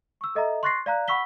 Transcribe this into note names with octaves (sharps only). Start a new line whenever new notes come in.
C#6 E6
A4 D#5 E5 A#5
C6 C#6 F#6 A6 A#6 C7
D5 F5 A#5 F#6
F#5 B5 C#6 E6 B6 G7